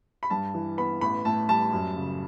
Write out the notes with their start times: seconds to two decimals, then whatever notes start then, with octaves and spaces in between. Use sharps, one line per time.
0.23 B5
0.30 G2 A5
0.54 E3
0.78 B3 B5
1.01 A1 B5
1.25 A2 A5
1.49 G3 A5
1.72 F#2
1.96 C#3